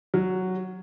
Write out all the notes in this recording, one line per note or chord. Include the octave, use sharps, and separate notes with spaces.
F#3